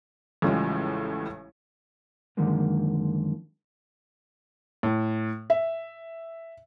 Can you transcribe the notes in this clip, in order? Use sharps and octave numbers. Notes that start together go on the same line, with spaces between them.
A1 A2 C#3 F3 G3 G#3
F#2 D3 D#3 F3 G#3 A#3
A2
E5